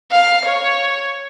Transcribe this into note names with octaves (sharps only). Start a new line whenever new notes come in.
F5
C#5